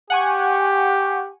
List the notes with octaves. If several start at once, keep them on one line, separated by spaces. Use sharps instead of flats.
G4 F#5 G#5 C#6